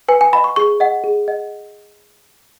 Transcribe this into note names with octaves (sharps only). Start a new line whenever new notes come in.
B4 G#5
G#5
D#5 F#5 B5
C#6
G#4 C#6
D#5 F#5
G#4
D#5 F#5